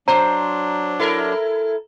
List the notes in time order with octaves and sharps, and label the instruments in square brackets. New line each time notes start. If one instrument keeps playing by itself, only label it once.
[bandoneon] F#3 D4 [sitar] C5 [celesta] A#5
[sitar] E4 A4 A#4